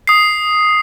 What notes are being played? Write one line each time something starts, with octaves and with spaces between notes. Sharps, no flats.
D#6 C7